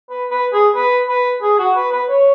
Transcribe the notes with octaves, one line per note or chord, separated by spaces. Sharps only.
B4
B4
G#4
B4
B4
G#4
F#4
B4
B4
C#5